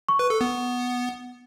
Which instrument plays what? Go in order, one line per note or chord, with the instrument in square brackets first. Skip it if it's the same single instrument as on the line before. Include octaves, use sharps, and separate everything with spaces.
[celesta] C#6
[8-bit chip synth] B4
A4
B3